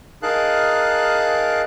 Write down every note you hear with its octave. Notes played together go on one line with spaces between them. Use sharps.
D#4 G#4 A#4 F5 A5 F#6